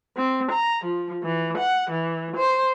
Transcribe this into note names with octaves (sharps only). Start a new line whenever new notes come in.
C4
A#5
F3
E3
F#5
E3
C5